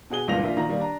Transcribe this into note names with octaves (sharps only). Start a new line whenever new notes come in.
B2 F#4 G#4 G7
G1 C#2 A#2 E3 A#6 F7
A#1 A#3 F4 E5
A#2 D#3 A#5 A#6
D#3 G3 A#3
D4 A#5